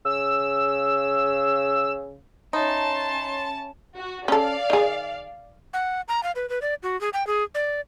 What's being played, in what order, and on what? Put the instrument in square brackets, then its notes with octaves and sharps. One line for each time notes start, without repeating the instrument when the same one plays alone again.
[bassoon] C#3 [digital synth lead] E6
[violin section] C#4 A5 [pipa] D#4 [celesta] C#5 E5 B5 [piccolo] C6
[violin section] F#4
[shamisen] C#4 A4 [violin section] D5 F5
[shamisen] D#3 G#4
[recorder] F#5
A#5
F5
B4
B4
D5
F#4
G#4
G5
G#4
D5